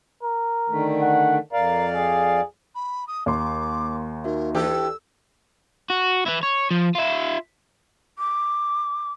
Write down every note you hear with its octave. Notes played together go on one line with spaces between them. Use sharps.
A#4
D3 D#3 A3
F#5
F2 A#4 D5 F5
G#4
B5
D#6
D#2 C6 D6
D#4 F#4 A#4 E5
E3 D4 G4 A4 E6
F#4
E3 E4
C#5
F3
F4 E5
D6